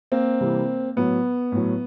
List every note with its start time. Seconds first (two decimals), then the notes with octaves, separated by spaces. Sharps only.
0.12 A#3 C4
0.41 C3 E3 G3
0.96 A2 F#3 B3
1.52 A2 F#3